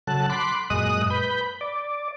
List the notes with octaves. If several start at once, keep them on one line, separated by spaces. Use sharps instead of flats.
C#3 F#3 A4 A5 F#6
B5 C6 D6 F#6
F#2 A#2 G#3 D#5 D#6 F#6
B4 B5 G6
D5